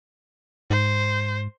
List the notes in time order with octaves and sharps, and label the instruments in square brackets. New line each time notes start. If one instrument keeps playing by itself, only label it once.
[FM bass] G#2 [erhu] C5